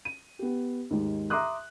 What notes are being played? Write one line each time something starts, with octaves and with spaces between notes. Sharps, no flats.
D#7
B3 G4
D#2 G#2
E5 A#5 C6 D6 D#6 F#6